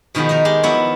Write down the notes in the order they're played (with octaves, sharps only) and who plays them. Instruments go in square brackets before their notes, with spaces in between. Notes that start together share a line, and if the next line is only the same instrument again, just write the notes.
[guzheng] B2 D#3 F3 B3 G#4
B3 D#4 A#4
G#3 G4
F3 F#3 B3 E4 F#4